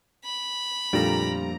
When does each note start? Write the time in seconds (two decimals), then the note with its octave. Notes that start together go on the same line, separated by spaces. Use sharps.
0.25 B5
0.93 F2 A#2 G3 A3 D4 A#5 A#6